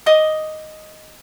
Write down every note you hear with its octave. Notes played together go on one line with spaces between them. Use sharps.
D#5 D6 D#6